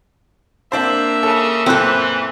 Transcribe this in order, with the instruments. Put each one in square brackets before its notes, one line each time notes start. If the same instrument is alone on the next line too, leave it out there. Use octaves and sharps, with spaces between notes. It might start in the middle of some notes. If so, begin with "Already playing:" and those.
[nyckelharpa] A#3 E5 [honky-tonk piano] C4 D4 C5
[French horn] C#3 [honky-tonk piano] A4
[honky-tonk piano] F#1 A#2 F#6 [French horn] E3 [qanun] C4 A4